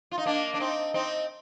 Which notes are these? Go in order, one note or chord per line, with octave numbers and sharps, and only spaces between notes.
F4
D#4
A#3 D4
D4
C4 D#4
C4 D#4